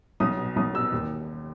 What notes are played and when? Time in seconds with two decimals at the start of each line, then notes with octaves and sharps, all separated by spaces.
0.20 B1 D#6
0.38 B2
0.56 B1 D#6
0.74 B2 E6
0.92 D#2